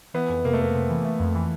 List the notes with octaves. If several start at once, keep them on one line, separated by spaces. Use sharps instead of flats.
E3 B3
F2
C3 A#3
A3
F2 A#3
C3
E3
A3
F2
E3